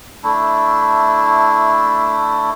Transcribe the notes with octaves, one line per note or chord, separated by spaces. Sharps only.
A3 D4 E4